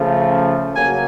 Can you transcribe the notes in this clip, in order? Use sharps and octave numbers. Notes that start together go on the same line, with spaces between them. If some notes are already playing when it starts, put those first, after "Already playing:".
Already playing: C#3 F3 A3
C#3 F#3 A#3 G#5